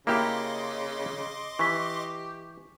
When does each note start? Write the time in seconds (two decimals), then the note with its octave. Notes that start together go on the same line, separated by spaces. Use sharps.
0.07 C#3 A#3 E4 G4 D#5 C6 D6
1.59 E3 G4 C#6 B6